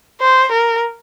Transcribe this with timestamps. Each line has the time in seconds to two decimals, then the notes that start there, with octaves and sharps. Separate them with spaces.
0.21 C5
0.52 A#4